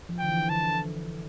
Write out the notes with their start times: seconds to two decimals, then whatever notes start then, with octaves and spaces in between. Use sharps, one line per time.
0.09 F3
0.19 D3 G5
0.29 E3
0.49 D3 A5